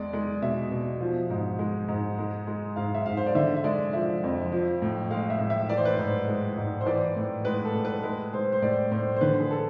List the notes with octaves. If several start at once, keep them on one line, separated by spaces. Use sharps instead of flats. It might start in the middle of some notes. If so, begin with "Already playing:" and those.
Already playing: E2 G#3 D5
G#3
B2 E5
B2
F3
G#2
G#3
G#2
G#3
G#3
G#2 F5
E5
G#2 F5
C5
D5
D3 E5
E5
G#3 D5
F3 E5
F2
F3
A2
G#3 F5
E5
A2
E5
E3 D5
C5
B4
C5
G#2
G#3
G#2
C5
E3 D5
A2
G#3 B4
A4
A2
B4
G#3 B4
G#3 C5
C5
A2 D5
A2 C5
C5
D3 B4
G#4
A4